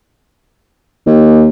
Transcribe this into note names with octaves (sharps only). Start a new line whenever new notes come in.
D#2